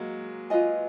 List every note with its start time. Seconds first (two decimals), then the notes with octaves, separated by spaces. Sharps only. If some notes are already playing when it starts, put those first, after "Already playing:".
Already playing: F#3 G#3 A#3
0.50 F4 B4 D#5 G#5